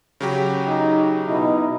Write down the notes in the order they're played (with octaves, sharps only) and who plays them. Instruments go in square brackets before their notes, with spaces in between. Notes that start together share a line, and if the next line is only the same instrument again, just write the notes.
[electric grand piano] C#3 F#3 G4
[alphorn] D#4
[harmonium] B2 D#4 [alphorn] E4